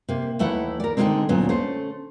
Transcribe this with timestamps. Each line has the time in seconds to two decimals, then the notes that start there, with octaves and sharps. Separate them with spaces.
0.09 C3 A#3
0.39 D#2 E3 A3 E4 F#5
0.80 A#4 D5
0.97 D3 D#3 F3 F#3 G#3 C4
1.29 D2 A#2 F#3 B3 C#4
1.49 A3 C#4 C5